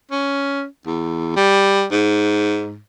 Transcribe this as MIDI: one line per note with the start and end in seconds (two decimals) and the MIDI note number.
0.11 0.65 61
0.86 1.32 40
1.36 1.85 55
1.91 2.79 44